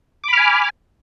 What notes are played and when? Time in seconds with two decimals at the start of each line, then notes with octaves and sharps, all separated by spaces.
0.24 D6
0.28 B5
0.33 F6
0.37 G#5